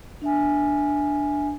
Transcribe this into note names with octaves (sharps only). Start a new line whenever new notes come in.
D4 E5 G#5